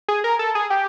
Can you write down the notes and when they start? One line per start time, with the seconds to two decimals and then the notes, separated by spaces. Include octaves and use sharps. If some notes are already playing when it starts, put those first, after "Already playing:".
0.08 G#4
0.24 A#4
0.39 A4
0.55 G#4
0.70 G4